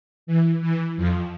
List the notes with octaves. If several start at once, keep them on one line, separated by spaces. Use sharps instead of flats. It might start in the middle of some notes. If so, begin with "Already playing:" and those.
E3
E3
F2 F3